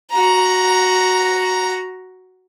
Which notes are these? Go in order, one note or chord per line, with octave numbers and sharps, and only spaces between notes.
F#4 A#5